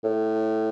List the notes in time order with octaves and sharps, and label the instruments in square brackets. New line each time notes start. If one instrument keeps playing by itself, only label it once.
[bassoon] A2